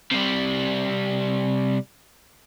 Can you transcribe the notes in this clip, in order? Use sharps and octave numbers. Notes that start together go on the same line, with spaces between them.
C3 G3